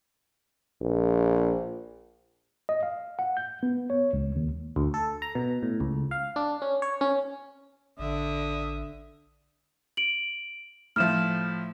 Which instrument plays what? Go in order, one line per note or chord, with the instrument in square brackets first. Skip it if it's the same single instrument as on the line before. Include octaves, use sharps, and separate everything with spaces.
[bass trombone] A#1
[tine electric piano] D#5
F5
F#5
G6
B3
C#5
C#2
D#2
[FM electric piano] D2
A4
A#5
B2
A2
C#2
F5
D4
C#4
C#5
C#4
[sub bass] A1 [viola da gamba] D3 [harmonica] E5 D#6
[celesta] D7 F#7
[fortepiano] A2 F3 [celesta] F6 E7